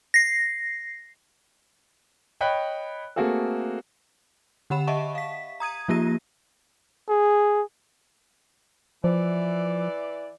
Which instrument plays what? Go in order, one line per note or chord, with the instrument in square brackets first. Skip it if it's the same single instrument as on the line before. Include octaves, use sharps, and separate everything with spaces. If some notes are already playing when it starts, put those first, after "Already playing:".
[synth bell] A#6 C7
[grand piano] C#5 D#5 G5 B5 F#6
A3 A#3 C4 F#4 G#4 A4
[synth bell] D3 G4 F#5 B5 E7
D#5 E5 F#5 A5 C#6
F5 B6
A#5 D#6 G#6 D#7
F3 A#3 F4 G4 A#6 D#7
[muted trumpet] G#4
[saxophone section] E3 D5 [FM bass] F3